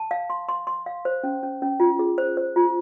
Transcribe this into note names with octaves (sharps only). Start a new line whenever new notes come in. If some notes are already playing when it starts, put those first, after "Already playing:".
Already playing: A5
F5
C6
C6
C6
F5
C5
C#4
C#4
C#4
F4
G#4
C5
C5
F4